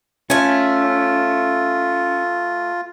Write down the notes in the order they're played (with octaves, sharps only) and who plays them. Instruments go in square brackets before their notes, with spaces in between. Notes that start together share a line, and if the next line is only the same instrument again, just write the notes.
[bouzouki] A3 G#5 [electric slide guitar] C#4 [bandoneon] F4